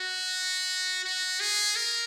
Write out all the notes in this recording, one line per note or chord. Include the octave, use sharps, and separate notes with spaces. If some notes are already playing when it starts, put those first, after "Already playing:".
Already playing: F#4
F#4
G#4
A#4